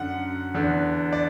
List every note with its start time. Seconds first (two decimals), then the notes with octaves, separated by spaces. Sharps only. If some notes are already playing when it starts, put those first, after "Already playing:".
Already playing: F#2 D3 F#5
0.55 E2 D3
1.13 D5